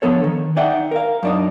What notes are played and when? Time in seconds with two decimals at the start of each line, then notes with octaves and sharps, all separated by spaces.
0.02 D3 F3 B3 A4 C#5
0.24 D#3
0.57 D#4 D5 E5 F#5 G5
0.91 A#4 F5
1.23 F#2 D4 D#4